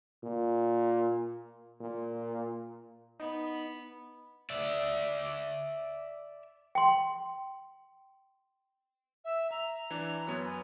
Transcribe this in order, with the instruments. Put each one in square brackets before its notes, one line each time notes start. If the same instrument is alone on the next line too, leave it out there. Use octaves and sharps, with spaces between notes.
[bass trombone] A#2
A#2
[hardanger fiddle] B3 [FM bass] D#4
[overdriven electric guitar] D5 E5
[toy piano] G5 C6
[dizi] E5
[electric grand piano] E5 [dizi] A#5
[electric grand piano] E3 D4 E4
[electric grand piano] F#2 F#3 B3 [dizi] C#5
[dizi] G#5